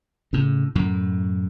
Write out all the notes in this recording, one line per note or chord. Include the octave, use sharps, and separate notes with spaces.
A2 C#3
F#2 A2